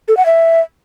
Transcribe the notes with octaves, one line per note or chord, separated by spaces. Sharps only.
A4
F#5
E5